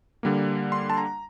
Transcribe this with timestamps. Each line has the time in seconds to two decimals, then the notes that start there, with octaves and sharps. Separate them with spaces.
0.23 D3 G3 A#3
0.72 C6
0.90 A5
0.97 A#5